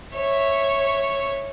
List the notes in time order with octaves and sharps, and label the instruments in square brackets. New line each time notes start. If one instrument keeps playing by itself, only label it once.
[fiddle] C#5 E5